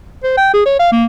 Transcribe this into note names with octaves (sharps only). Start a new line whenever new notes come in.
C5
G5
G#4
C#5
F5
A#3